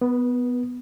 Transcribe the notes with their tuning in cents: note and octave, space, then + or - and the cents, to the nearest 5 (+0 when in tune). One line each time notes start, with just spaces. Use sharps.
B3 +5 B4 -25